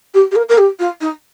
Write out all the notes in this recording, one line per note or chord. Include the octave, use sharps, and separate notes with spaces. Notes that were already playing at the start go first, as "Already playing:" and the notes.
G4
G4
A#4
A#4
G4
F4
D#4